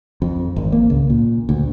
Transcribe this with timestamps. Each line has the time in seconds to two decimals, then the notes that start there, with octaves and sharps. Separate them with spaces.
0.22 F2
0.56 G#1
0.72 A#3
0.90 C#2
1.10 A#2
1.49 D2